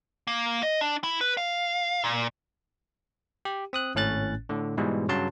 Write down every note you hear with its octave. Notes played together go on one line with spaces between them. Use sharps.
A#3
D#5
D4
E4
B4
F5
A#2
G4
C4 D#6 F#6
G#1 A2 C#4 F#6 A6
A2 D3
G#2 B2 E3 G3 G#3
G2 C#3 F#3 A5 C6